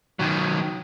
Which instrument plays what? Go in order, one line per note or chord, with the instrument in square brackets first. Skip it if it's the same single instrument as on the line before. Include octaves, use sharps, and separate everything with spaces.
[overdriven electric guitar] D#3 F#3